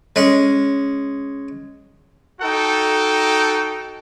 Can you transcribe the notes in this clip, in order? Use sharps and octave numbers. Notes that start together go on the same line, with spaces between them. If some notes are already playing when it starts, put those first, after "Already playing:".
G#3 C#4
D#4 F#4 A4 G5